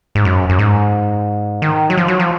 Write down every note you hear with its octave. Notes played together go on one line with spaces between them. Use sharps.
G#2
F#2
F#2
G#2
D#3
F#3
F3
F#3
F3